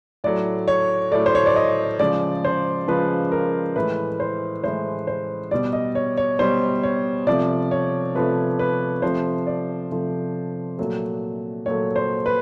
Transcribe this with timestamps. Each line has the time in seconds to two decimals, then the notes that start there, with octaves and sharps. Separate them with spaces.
0.24 A2 F#3 A3 D5
0.68 C#5
1.12 A2 F#3 A3 D5
1.26 C5
1.35 C#5
1.46 D5
1.56 D#5
1.99 C#3 F3 G#3 D5
2.45 C5
2.88 C#3 F3 G#3 B4
3.32 A#4
3.76 A2 E3 G#3 B4
4.20 C5
4.64 A2 E3 G#3 C5
5.07 C5
5.51 B2 G3 D5
5.73 D#5
5.95 C#5
6.18 C#5
6.39 B2 G3 C5
6.83 C#5
7.27 C3 F3 A3 D5
7.71 C#5
8.15 C3 F3 A3 B4
8.59 B4
9.02 C3 F3 A3 C5
9.47 D5
9.91 C3 F3 A3
10.79 A#2 F#3 A3
11.66 A#2 F#3 A3 C#5
11.96 C5
12.26 B4